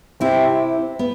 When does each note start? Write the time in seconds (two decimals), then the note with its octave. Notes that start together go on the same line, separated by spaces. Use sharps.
0.21 C3 C4 E4
0.99 B3